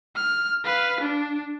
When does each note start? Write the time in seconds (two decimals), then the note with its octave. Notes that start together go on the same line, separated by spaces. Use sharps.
0.16 F6
0.65 B4 F5
1.01 D4